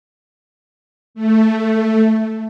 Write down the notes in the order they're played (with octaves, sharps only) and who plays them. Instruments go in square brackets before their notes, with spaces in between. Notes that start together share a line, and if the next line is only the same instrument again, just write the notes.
[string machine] A3